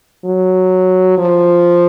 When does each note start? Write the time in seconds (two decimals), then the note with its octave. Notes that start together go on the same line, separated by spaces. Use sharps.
0.25 F#3
1.18 F3